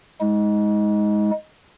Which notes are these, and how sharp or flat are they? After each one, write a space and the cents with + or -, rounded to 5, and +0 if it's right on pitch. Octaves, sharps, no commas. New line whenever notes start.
G#3 +0 D#4 +40